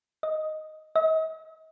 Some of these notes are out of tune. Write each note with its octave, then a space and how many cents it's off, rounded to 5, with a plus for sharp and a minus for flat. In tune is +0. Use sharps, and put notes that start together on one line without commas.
D#5 +0
D#5 +45